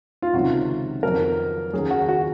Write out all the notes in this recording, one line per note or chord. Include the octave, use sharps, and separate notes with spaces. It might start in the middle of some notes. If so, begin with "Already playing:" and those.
F4
C#2 C3 D#3 F#3 F#4
F2 D#3 F#3 A#4
D#2 C#3 F#3 G#4
F#4
F#4